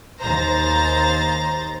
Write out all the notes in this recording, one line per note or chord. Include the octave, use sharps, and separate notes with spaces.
D#2 C5 A#5 A6 A#6